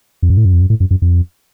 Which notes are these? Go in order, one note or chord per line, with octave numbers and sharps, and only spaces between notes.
F2
F#2
A2
F#2
F2
F#2
A2
F#2
F#2
F2